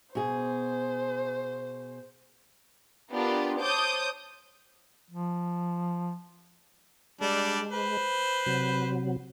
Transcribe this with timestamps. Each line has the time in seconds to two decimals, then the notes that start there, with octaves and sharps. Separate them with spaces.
0.15 B2 G#4 C5
3.11 B3 D4 F4 G4 A#4
3.59 C5 C#5 A5 D6 D#6 G6
5.09 F3
7.21 G3 G#3 D4
7.72 B4 C5
8.46 C3 F#3